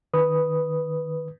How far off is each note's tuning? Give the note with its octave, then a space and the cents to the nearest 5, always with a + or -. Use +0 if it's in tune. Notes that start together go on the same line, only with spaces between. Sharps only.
D#3 -10 B4 +0 D#6 +0